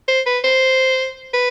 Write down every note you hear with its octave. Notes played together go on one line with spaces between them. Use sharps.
C5
B4
C5
B4